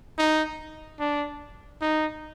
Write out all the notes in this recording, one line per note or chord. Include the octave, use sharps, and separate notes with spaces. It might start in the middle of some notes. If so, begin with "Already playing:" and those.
D#4
D4
D#4